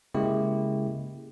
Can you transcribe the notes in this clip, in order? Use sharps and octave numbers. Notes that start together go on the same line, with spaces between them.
C#3 G#3 A#3 E4 G4